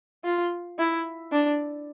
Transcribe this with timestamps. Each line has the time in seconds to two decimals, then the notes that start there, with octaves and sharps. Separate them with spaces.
0.25 F4
0.78 E4
1.32 D4